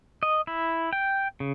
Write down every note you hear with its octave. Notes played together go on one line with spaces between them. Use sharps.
D#5
E4
G5
C#3